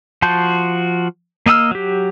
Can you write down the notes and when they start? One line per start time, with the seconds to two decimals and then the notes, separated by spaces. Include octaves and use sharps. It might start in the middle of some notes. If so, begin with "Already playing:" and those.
0.22 F3 F#4 A5 C6 G6
1.46 A#3 D#5 F5 E6 F6
1.71 F#3 G4